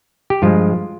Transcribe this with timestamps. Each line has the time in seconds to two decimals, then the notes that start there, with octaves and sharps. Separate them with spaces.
0.30 G4
0.42 G2 F3 G#3 F4